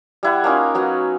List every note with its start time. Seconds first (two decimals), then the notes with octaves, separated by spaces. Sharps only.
0.23 G3 E4 F#5
0.44 A#3 C#4 D#4 F4
0.75 F#3 B3